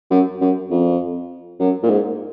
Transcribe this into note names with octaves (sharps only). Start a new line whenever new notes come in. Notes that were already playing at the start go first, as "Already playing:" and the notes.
F#2
F#2
F2
F#2
A#2
G#2